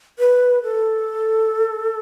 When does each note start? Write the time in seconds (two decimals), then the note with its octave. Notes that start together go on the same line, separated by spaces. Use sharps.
0.19 B4
0.63 A4